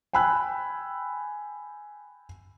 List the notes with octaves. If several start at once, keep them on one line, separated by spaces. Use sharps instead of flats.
G5 G#5 B5 E6 F#6